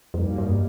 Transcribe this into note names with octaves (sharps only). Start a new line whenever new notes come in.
B1 F2 B2 G3 A#3 D#4
G2